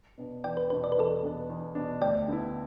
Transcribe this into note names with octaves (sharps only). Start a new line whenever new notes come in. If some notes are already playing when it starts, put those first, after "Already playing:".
B2 B3 D4
E2 D5 G5
B4
B2 B3 D4 B4
D5
B4
E2 A4 D5
B2 B3 D4
E2
B2 B3 D4
D2 D5 G5
D3 B3 E4